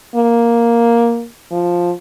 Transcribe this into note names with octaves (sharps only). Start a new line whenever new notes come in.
A#3
F3